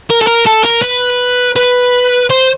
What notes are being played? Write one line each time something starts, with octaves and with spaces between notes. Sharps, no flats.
A#4
A4
A#4
A4
A#4
B4
B4
C5